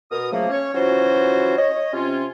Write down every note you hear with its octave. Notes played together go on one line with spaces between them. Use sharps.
B2 A#4 D#6
C#3 F3 F#3 A3 A#3
C#4 C#5
E3 F#3 C#4 F4 F#4 C5
C#5 D#5
C3 C#4 F4